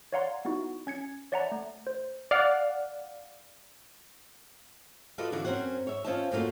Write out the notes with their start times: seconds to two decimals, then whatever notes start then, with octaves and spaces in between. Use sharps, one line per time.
0.13 C#5 D5 F5 F#5 A#5 C6
0.45 B3 D#4 E4 F#4
0.87 C#4 G#6 C#7
1.32 C#5 D5 E5 F#5 A5 A#5
1.52 A3
1.87 C5
2.31 D5 F5 F#5
5.18 F4 F#4 A4 B4 D5 D#5
5.32 D3 E3 F#4 D5
5.45 F#2 C4 C#4 C5 F#5
5.87 C#5 E5
6.05 C#4 F4 C5 D#5 E5 A5
6.31 F#2 A3 A#3 C4 F4 F#4